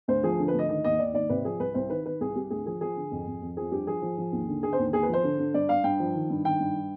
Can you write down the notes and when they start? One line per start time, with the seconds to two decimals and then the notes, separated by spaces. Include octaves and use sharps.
0.08 D2 C5
0.23 F3 G#4
0.39 D3
0.48 B4
0.54 D2 D#5
0.69 D#3 D#5
0.84 D#2 D#5
0.99 D#3 D5
1.14 D#2 D5
1.29 C3 B4
1.45 F3 G#4
1.60 C2 B4
1.74 C2 C5
1.90 D#3 B4
2.05 D#3 B4
2.21 C2 G#4
2.36 C2 G4
2.50 D2 G#4
2.66 F3 G#4
2.81 F3 G#4
2.96 D3
3.11 F2
3.27 F2
3.42 F2
3.57 F3 G#4
3.71 G2 G4
3.87 F3 G#4
4.02 F3
4.18 F3
4.32 D#2
4.47 D3
4.63 D3 G#4
4.73 C5
4.78 D#2
4.93 D#2 G#4
5.03 F3 B4
5.13 C5
5.23 D3
5.39 D3
5.54 G2 D5
5.69 G2 F5
5.84 G2 G5
6.00 F3
6.15 D#3
6.30 G2
6.45 D#3 G5
6.60 G2